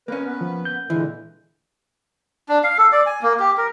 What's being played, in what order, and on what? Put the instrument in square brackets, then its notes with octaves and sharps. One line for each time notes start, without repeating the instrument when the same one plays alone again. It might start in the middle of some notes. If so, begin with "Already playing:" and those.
[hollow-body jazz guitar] A#3 C#4 [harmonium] B4
[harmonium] B3 B4
[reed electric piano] F3
G6
[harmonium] A#2 D3 G#3 [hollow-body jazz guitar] E3
[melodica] D4
F5
A4
D5
G#5
A#3
G4
A#4